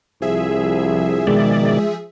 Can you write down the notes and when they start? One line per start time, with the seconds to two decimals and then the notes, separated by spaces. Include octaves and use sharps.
0.22 C2 F3 G#4 E5
1.27 B2 D#3 G#3 D5